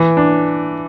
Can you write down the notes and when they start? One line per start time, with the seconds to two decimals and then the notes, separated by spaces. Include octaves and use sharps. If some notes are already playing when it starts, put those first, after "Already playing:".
Already playing: E3
0.17 D4